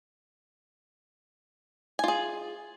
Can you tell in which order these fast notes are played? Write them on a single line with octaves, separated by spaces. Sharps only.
G#5 F4 G#4